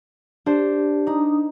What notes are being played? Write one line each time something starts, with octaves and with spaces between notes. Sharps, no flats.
D4 G4 C5
D4 D#4 A#5 D#6